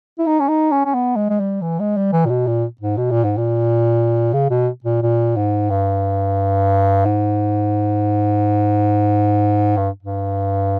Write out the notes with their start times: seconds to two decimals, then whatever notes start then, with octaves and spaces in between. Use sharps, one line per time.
0.19 E4
0.27 D#4
0.40 C#4
0.49 D#4
0.72 C#4
0.85 C#4
0.94 B3
1.16 G#3
1.30 G#3
1.40 G3
1.62 E3
1.80 G#3
1.97 G3
2.13 E3
2.26 A#2
2.30 B2
2.47 A#2
2.81 G#2
2.98 B2
3.11 A#2
3.25 G#2
3.38 A#2
4.34 C#3
4.50 B2
4.84 A#2
5.02 A#2
5.37 G#2
5.70 G2
7.06 G#2
9.77 G2
10.03 G2